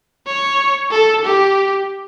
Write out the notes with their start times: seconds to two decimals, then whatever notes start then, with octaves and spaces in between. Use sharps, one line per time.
0.27 C#5
0.91 A4
1.25 G4